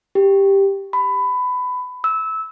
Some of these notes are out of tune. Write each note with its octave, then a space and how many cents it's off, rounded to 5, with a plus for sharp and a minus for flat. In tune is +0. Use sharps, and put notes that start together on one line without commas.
G4 +5
B5 +20
E6 -20